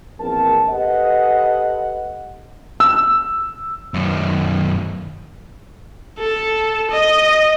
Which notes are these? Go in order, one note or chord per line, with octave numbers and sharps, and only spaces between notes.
A#1 E2 A#3 C4 A#4 A5
G4 A4 B4 C5 D#5 F#5
E6
F#2 D#3
A4
D#5